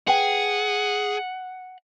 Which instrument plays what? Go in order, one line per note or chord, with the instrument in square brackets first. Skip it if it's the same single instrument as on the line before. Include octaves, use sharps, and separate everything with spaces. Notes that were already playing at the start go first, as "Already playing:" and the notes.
[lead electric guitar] G#4 [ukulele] B4 G5 [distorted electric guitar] F#5